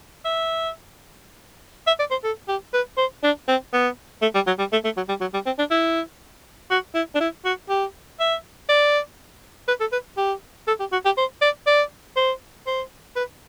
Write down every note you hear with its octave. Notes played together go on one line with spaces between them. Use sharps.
E5
E5
D5
C5
A4
G4
B4
C5
D4
C4
B3
A3
G3
F#3
G3
A3
A3
F#3
G3
F#3
G3
C4
D4
E4
F#4
E4
D4
E4
F#4
G4
E5
D5
B4
A4
B4
G4
A4
G4
F#4
G4
C5
D5
D5
C5
C5
B4